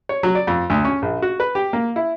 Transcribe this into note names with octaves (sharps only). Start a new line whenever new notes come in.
C#5
F#3
D5
F2
D2
C#4
A#1
F#4
B4
G4
A#3
E4